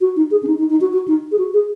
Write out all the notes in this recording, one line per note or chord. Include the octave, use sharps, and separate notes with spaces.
F#4
D#4
G#4
C#4
D#4
D#4
D#4
F#4
F#4
D#4
G#4
F#4
G#4